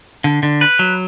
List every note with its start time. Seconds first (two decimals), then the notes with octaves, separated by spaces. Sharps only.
0.24 D3
0.43 D3
0.61 B4
0.79 F#3